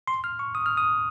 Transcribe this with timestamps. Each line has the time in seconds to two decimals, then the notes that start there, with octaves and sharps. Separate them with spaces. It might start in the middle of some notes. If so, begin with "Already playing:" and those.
0.07 C6
0.24 F6
0.39 C#6
0.55 D#6
0.66 F6
0.77 D#6